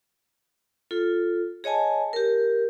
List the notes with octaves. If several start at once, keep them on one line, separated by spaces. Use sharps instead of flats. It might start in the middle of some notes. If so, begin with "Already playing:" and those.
F4 A4
G#4 C#5 D#5 G#5 A5
G4 A#4